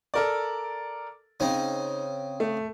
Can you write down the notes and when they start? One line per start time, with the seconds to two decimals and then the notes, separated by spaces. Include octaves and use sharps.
0.14 A4 A#4 D5
1.40 C#3 C4 D#4
2.40 A3